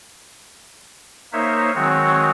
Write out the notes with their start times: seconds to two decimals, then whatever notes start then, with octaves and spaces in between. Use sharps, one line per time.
1.33 A#3 D#4 A#4 C5 C#5 E5
1.75 D#3 F#3 G#3 C4 F#4 C#5